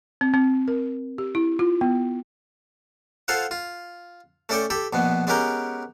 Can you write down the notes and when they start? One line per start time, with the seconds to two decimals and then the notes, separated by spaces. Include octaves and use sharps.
0.21 C4
0.34 C4
0.68 A#4
1.18 G4
1.35 E4
1.59 F4
1.81 B3
3.28 F4 A4 C5 F5 F#5
3.51 F4
4.49 A3 C#4 A4 D5 G5 C#6
4.70 G4 A4 G5 B5
4.93 A#1 B2 B3
5.27 G#3 B3 C#4 G4 A#4 G5